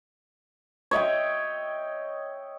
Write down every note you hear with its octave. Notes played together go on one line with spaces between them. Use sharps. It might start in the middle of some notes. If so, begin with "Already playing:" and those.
C#5 D#5 E5 G5